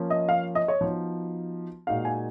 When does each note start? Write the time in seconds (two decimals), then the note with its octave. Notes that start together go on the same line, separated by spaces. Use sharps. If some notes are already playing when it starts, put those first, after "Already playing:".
Already playing: F3 A#3 C#4
0.10 D#5
0.29 F5
0.55 D#5
0.68 C#5
0.81 F3 B3 D#4 F#4
1.87 A#2 G#3 D#4 F#4 F5
2.05 G#5